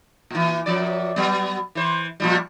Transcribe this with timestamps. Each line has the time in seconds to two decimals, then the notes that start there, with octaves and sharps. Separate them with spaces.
0.31 A#2 E3
0.66 F#2 F3 D5
1.16 F#3 B3
1.75 E3 C5
2.20 A#2 F3 G3